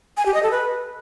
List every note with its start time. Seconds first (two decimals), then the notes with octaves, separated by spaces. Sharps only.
0.17 G#5
0.26 G4
0.34 D#5
0.43 A4
0.51 B4